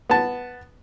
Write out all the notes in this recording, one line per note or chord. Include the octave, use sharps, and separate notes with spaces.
B3 A5